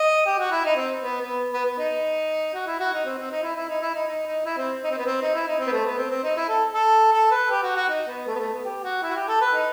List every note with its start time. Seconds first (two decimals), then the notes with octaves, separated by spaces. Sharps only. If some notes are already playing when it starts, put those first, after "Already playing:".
Already playing: D#5
0.26 G4
0.39 F#4
0.51 E4
0.65 D#4
0.76 C4
1.02 B3
1.21 B3
1.53 B3
1.65 B3
1.78 D#4
2.54 F#4
2.67 E4
2.79 F#4
2.93 D#4
3.06 C4
3.18 C4
3.31 D#4
3.43 E4
3.56 E4
3.69 D#4
3.81 E4
3.94 D#4
4.07 D#4
4.27 D#4
4.45 E4
4.57 C4
4.84 D#4
4.91 C4
4.98 B3
5.06 C4
5.22 D#4
5.34 E4
5.47 D#4
5.59 C4
5.67 B3
5.72 A3
5.86 B3
5.98 C4
6.10 C4
6.23 D#4
6.36 E4
6.49 A4
6.73 A4
7.13 A4
7.31 B4
7.50 G4
7.63 F#4
7.76 F#4
7.89 D#4
8.07 B3
8.27 A3
8.35 B3
8.39 A3
8.52 B3
8.65 G4
8.83 F#4
9.02 E4
9.09 F#4
9.16 G4
9.28 A4
9.41 B4
9.53 D#4